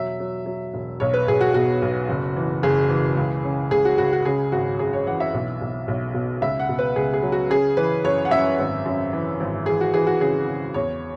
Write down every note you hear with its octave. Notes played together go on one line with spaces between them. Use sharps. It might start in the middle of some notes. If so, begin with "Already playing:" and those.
Already playing: E1 F#3 E5
F#3
F#3
E1
B1 C#5
B4
B1 G#4
F#4
B2 F#4
B1
F#1
E3
F#1 G#4
E3
C#2
C#3
C#2 G#4
F#4
C#2 F#4
F#4
C#3 G#4
G#1 F#4
F#2 G#4
C#5
E3 F#5
E5
B1
B1
B1
B2
C#2 E5
F#5
B2
B4
C#2 G#4
G#4
F#3
F#4
C#3 G#4
E3 B4
F#2 C#5
F#5
F#2 E5
G#1
F#2
E3
G#1
E3 G#4
F#4
E3 G#4
F#4
C#3 G#4
C#3
E2 C#5